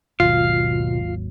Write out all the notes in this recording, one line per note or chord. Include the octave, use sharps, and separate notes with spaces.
G#1 D#2 B2 F#3 F4 F5